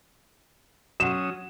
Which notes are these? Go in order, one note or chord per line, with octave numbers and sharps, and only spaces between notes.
F#3 C#4 F#4 F#5 D#6 E7